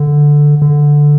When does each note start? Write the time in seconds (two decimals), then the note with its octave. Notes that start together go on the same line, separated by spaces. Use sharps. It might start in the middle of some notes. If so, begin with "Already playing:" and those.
Already playing: D3
0.62 D3